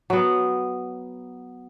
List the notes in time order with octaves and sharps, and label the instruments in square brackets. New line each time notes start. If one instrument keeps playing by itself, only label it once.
[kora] F#3 B3